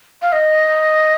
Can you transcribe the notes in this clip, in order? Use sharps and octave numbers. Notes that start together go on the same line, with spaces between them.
F5
D#5